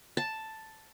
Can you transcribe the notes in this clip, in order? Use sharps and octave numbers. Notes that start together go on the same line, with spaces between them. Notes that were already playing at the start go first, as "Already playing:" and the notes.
A5